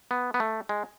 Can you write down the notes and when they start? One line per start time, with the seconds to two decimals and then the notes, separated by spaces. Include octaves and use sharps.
0.11 B3
0.34 B3
0.40 A3
0.69 G#3